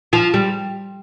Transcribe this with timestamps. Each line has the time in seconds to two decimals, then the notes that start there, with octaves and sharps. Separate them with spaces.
0.13 F3
0.34 G3